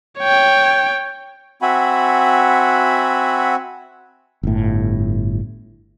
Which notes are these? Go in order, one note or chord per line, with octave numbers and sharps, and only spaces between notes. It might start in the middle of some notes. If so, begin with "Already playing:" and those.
C#5 G5
C4 F#4 E5 F#5 G#5 B5
G1 A2